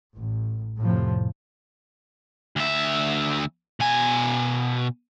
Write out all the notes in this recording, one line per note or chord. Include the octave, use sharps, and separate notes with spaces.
A1
F2 A2 C3 F3
D2 E5
B2 G#5